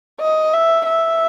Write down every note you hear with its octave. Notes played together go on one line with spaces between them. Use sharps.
D#5
E5
E5